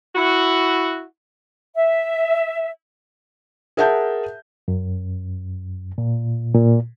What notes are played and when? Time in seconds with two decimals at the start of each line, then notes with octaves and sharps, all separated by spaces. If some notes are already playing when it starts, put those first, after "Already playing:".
0.15 E4 F#4
1.76 E5
3.77 G#4 A#4 E5 F#5 A5 G6
4.68 F#2
5.98 A#2
6.54 A#2